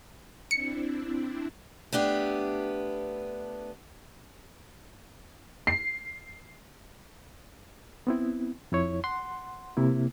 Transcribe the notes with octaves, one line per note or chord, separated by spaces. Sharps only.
C4 D4 E4 C#7
A3 B3 D4 G4
C7
B3 C4 E4
F2 E4 C#5
F#5 C6
C3 A#3 E4